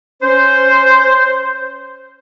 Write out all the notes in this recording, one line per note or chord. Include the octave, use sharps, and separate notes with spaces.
C#4 C5